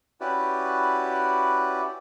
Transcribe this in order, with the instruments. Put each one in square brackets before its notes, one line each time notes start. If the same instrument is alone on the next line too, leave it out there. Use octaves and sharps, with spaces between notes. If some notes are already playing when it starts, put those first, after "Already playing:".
[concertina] C#4 E4 F#4 G4 B4 D5